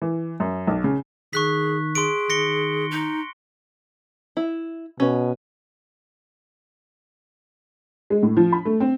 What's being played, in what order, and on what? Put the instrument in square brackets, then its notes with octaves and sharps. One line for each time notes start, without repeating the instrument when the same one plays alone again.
[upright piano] E3
F#2
B1
C#3
[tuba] D#3 [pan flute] G#4 [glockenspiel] C#6 F#6 B6
[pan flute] G#4 [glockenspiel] C6 D7
[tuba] D#3 [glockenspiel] A#6 C#7 G7
[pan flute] D#4
[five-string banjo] E4
[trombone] B2 [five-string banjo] C#4 B4
[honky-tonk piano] G#3
A2
F3
B5
A3
C4